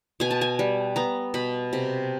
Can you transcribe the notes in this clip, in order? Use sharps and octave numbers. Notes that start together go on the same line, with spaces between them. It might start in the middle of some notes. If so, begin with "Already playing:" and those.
B2 G#5
A5
G#5
G3
B3 A#5
B2 B5
C3